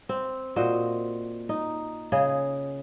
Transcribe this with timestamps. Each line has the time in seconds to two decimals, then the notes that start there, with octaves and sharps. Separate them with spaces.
0.09 C4
0.56 A#2 F#4 C5 D#5
1.49 D#4
2.12 C#3 G#4 D#5